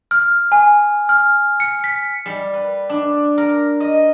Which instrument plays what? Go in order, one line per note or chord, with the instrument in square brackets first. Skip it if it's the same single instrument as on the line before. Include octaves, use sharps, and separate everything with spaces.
[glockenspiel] F6
G#5
F6
C#7
B6
[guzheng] G3
B4
D4
A#4
D#5